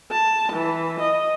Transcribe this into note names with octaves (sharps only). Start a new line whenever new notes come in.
A5
E3
D#5